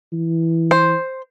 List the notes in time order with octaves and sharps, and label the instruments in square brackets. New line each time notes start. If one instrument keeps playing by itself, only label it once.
[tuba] E3
[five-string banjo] C5